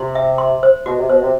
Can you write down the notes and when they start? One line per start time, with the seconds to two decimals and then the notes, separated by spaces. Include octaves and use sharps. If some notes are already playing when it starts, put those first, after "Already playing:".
Already playing: C3 C6
0.15 E5
0.38 C6
0.63 C5
0.86 B2 F#4
0.98 C3
1.09 B2 C5
1.22 C3